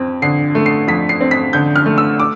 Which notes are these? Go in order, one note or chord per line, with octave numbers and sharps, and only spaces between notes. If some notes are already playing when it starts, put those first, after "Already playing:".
Already playing: F2 C4
D3 C7
A3
C7
F2 B6
C7
C4
B6
D3 G6
F6
A3
E6
D6